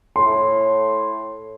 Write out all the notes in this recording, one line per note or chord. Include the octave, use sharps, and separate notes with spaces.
A2 C6